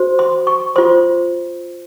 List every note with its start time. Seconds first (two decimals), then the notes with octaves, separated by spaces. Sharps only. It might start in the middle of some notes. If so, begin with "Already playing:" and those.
Already playing: F#4 C5
0.19 C6
0.47 C#6
0.76 F4 C5 C6